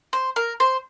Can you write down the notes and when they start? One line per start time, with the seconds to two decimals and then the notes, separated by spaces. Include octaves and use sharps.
0.13 C5
0.36 A#4
0.60 C5